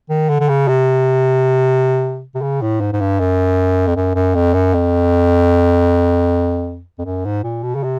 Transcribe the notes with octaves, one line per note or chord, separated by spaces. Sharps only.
D#3
D3
D3
C#3
C3
C3
C#3
A2
G#2
G#2
G2
F#2
F2
F#2
F#2
F2
F#2
F2
F2
F#2
G#2
A#2
B2
C#3
C3